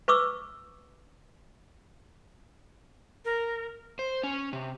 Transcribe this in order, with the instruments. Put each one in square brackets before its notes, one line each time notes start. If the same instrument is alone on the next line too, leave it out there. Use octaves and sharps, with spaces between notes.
[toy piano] B4 C#6 D6 E6
[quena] A#4
[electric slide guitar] C5
C#4
C3